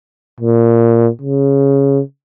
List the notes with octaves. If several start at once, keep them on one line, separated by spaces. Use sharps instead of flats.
A#2
C#3